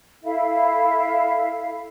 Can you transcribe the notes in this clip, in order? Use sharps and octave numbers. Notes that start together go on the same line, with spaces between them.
E4 A4 E5 F5